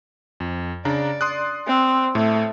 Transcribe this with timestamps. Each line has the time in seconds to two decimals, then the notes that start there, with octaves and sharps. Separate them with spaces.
0.40 F2
0.85 C#3 D4 D5 A#5
1.21 C6 D#6 F#6
1.67 C4
2.15 A2 A3